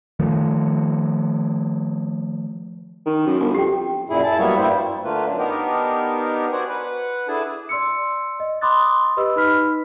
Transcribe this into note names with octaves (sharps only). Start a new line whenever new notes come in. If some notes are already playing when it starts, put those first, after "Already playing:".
D#3 F3 A3
D#3
F#2
G1
F2 G4 G5
F#2 A#2 E4 G#4
E4 A5
F#3 G3 A#3 B3 C#5 E5
G2 G3 A#3 E4 C5
D3 A3 A#3 F4 B4
F#2 D4
B3 D4 D#4 G4 A#4
F#4 C5 D5 F#5 G#5
B4 F#5
D4 E4 G#4 A4 G#5 A5
D5 C6 E6 C#7
D#5
B5 C6 D6 D#6 F#6 A6
G4 B4 D#5 B5 E6
D#4 B4 B5 F6 B6